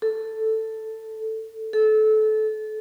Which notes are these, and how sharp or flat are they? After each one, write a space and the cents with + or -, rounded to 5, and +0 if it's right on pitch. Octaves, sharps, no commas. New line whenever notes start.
A4 +5
A4 -25